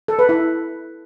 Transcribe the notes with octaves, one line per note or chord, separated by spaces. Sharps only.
A4
B4
E4